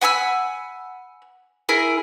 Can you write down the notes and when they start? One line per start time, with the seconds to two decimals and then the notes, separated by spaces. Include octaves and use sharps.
0.01 F#5 G#5 B5 E6
1.69 E4 G#4 A#4 G#5